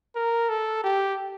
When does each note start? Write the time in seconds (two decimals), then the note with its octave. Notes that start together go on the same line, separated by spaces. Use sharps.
0.15 A#4
0.49 A4
0.84 G4